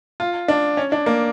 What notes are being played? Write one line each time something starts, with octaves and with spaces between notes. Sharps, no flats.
F4
D4
C#4
D4
A#3